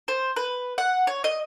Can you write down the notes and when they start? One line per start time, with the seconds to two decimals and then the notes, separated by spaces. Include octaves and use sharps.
0.08 C5
0.36 B4
0.78 F#5
1.07 C#5
1.24 D#5